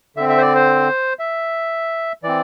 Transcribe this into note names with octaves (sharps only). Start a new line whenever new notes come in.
D3 C4 E5
E5
C5
D5
C5
E5
E3 C4 D5